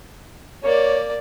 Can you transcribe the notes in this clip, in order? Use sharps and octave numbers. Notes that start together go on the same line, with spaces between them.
A#3 C#5 D5